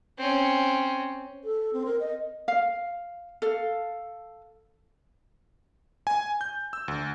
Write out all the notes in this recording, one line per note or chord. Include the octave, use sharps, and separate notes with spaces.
C4 C#4
A4
C4
A#4
D#5
F5
A4 F5
G#5
G6
E6
D2